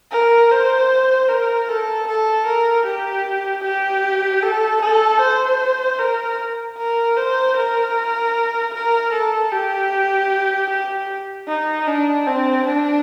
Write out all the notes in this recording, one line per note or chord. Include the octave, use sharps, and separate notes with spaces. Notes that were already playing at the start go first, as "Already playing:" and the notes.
A#4
C5
A#4
A4
A4
A#4
G4
G4
A4
A4
C5
A#4
A#4
C5
A#4
A#4
A4
G4
G4
D#4
D4
C4
D4